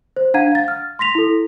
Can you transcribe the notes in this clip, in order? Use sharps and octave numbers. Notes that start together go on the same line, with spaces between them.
C5
D4 F5 F#5 A#5 G#6 D#7
F5 A6
F6
C6 A#6 B6 F7
E4 A4